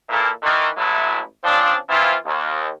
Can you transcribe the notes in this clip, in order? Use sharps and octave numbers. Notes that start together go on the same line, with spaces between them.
A#2 E3 A#3 E4 A4
D#3 E3
A1 E3 F#3 G#3 A3 E4
C#3 F3 C4 D4
E3 F3 C4 E4 F4
D#2